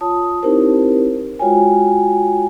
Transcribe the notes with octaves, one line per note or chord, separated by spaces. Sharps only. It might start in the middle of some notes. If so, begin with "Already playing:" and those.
F4 C#5 A5 D#6
C4 D#4 E4 G4 A#4 C5
G#3 F4 F#4 C#5 G5 G#5